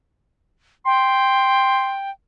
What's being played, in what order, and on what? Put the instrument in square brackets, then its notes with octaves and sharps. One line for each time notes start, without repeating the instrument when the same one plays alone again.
[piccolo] G5 [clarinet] C6